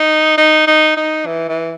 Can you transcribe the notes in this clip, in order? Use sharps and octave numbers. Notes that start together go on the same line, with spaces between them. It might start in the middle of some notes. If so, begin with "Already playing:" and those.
Already playing: D#4
D#4
D#4
D#4
E3
E3